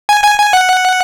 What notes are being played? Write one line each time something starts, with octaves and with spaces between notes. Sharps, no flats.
G#5
G#5
G#5
F#5